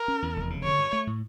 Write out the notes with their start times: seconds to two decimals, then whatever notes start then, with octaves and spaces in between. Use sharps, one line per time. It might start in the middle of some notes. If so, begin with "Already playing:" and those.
Already playing: A#4
0.08 C#4
0.22 E2
0.36 F1
0.50 C#3
0.64 D3 C#5
0.78 G2
0.93 A3
1.07 A2